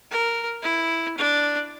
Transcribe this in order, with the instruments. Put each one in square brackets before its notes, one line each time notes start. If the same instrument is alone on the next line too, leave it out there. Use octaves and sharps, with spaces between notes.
[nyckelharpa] A#4
E4
D4